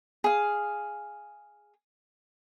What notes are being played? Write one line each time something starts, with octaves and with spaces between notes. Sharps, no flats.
G#4 F5